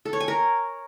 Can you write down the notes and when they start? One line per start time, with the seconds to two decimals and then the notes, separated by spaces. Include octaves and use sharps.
0.05 A4
0.13 C#5
0.20 G#5
0.28 A#4